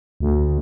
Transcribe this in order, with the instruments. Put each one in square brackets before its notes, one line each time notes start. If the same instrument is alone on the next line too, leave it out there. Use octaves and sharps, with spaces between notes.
[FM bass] D2